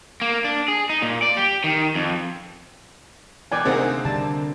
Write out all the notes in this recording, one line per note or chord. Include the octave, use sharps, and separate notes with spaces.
A#3
D4
G#4
D#4
A#2
D5
G4
D#3
F2
B2 E3 D5 G5 G#5
D2 C3 A#3 C4 D#4 G#4 F#5
D3 G3 D4 A5